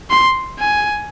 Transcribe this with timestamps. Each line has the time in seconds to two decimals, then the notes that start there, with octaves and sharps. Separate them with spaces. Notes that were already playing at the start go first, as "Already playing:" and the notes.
0.10 C6
0.59 G#5